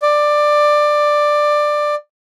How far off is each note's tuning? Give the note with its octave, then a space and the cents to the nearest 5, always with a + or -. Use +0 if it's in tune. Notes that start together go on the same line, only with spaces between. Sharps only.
D5 +15